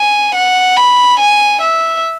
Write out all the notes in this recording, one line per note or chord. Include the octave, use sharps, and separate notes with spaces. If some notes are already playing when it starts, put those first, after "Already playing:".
Already playing: G#5
F#5
B5
G#5
E5